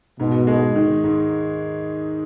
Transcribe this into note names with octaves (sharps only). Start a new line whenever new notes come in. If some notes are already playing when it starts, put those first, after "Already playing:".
G#2 B2
G#3
D#3
G#2